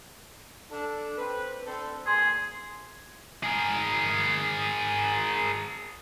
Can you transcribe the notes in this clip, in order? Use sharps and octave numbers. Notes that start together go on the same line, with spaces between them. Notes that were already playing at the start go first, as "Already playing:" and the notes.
D4 A4
C4 B4
C4 D4 A4
A#2 D#3 G#4 C6
G#4 A#4